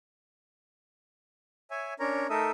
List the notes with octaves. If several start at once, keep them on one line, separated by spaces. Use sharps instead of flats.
C#5 E5 G#5
C#4 D4 A#4 C#5 A#5
A3 D#4 A4 A#4 E5 D#6